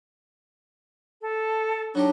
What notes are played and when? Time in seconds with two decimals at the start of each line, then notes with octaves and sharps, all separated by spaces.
1.21 A4
1.95 F#3 D4 D#4 G4